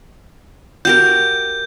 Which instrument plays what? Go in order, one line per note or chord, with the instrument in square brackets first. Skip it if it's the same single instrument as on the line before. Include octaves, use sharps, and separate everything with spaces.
[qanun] F#4 G4 A#4 [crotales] G6